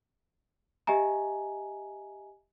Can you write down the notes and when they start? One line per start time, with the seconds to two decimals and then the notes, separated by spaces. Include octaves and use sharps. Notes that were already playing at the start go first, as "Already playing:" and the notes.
0.87 G4 D#5 E5 G#5 A#5